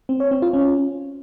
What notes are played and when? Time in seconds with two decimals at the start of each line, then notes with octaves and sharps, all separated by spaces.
0.09 C4
0.20 C#5
0.31 C4
0.42 F4
0.53 C#4